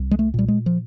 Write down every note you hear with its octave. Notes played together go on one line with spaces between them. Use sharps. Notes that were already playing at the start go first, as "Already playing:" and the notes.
Already playing: C2
G#3
A3
A#2 G3
G#3
F3